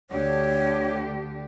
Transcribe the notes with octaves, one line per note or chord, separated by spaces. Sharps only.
D2 D3 G4 C#5